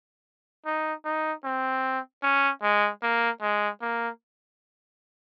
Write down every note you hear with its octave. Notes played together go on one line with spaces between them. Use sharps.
D#4
D#4
C4
C#4
G#3
A#3
G#3
A#3